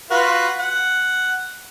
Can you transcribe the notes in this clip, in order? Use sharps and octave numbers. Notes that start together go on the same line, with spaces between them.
F4 F#4 B4
F#5